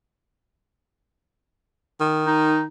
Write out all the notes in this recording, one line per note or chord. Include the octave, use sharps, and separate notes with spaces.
D#3
D#4